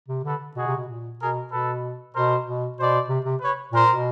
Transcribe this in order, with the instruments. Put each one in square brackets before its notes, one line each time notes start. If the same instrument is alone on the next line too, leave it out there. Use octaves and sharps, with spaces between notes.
[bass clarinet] C3
[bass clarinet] D3 [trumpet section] A4 B4
[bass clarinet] B2 [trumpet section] F#4 G#4
[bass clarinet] C3
B2
A#2
[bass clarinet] B2 [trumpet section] G#4 A#4
[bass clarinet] B2 [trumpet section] A4 B4
[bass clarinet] B2 [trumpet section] A#4 C5
[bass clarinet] B2
[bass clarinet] B2 [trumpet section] C5 D5
[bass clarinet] C3
C3
[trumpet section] B4 C#5
[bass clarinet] A#2 [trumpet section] A#4 C5
[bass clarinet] B2